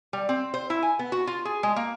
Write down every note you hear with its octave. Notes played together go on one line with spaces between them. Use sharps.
G3
C4
C5
E4
G#5
B3
F#4
F4
G#4
G#3
A#3